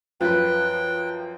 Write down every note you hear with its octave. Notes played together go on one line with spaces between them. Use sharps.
F#2 F3 F4 B4 G5 F#6